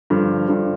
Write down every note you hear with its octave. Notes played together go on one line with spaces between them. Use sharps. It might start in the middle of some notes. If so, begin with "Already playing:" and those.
G2 D3 F3
G2 D3 F3